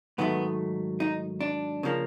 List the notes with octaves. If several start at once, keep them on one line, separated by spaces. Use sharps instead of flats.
G#2 D#3 F#3 A3 B3
D#4
D4
C#3 F3 A#3